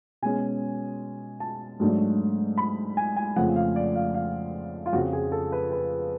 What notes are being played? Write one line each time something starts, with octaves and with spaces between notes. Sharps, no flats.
B2 G#3 C#4 G#5
A5
G#2 F#3 A3 D4
B5
G#5
G#5
F2 C#3 F3 A3 F#5
F5
D5
F5
F5
F4
F2 C#3 F3 F#4
G#4
A4
B4
B4